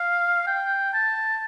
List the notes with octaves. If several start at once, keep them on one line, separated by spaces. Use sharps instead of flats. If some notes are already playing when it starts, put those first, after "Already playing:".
Already playing: F5
G5
A5